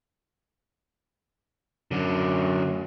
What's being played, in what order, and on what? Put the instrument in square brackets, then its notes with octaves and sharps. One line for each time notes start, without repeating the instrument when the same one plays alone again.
[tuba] F#2 [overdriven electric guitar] D3 F#3